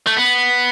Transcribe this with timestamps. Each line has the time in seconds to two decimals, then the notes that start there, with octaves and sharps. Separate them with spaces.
0.07 A3
0.17 B3